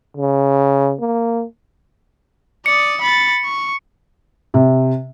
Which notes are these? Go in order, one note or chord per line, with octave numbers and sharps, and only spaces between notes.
C#3
A#3
D5 D#6 C#7
B5 A6
C#6
C3